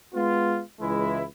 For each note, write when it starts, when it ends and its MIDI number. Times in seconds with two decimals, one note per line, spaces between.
0.14 0.61 56
0.14 0.61 59
0.14 0.61 65
0.81 1.24 37
0.81 1.24 52
0.81 1.24 56
0.81 1.24 64